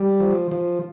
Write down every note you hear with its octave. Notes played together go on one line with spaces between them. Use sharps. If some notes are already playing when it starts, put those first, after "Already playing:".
Already playing: G3
F3
F3